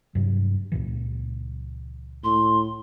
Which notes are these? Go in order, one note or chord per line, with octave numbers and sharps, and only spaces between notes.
G2 C3 F#3
C#2 A#2 E3
A2 C6